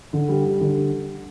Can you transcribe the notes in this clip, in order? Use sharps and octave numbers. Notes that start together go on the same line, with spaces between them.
D3
G3
G3
D3